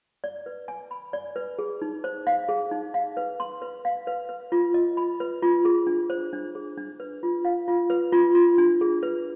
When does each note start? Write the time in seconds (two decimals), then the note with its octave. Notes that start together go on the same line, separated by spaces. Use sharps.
0.24 D5
0.46 B4
0.68 G#5
0.91 B5
1.13 D5
1.36 B4
1.59 G#4
1.82 D#4
2.04 C5
2.27 F5
2.49 G#4
2.71 D#4
2.94 F5
3.17 B4
3.40 C6
3.62 B4
3.85 F5
4.07 B4
4.29 B4
4.52 F4
4.74 D#5
4.97 B5
5.20 B4
5.42 F4
5.65 G#4
5.87 D4
6.10 C5
6.33 D4
6.55 G#4
6.77 D4
7.00 B4
7.23 F4
7.45 F5
7.68 F4
7.90 B4
8.12 F4
8.35 F4
8.58 D4
8.81 G#4
9.03 B4